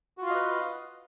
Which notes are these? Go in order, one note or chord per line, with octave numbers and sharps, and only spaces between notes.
F4 F#4 B4 D#5 F5